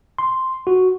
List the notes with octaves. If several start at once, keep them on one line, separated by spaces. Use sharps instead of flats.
C6
F#4